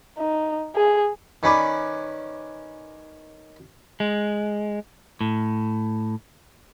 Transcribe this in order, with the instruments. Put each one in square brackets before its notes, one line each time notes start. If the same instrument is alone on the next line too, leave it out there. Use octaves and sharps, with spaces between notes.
[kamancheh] D#4
G#4
[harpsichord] D#3 C#4 B4 D5
[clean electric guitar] G#3
A2